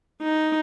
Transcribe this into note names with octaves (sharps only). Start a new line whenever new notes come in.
D#4